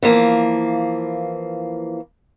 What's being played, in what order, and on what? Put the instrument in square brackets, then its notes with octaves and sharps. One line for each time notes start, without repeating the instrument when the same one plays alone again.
[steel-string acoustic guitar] E3 F3 A#3